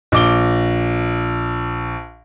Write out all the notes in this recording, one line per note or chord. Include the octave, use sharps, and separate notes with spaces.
A#1 D6 G7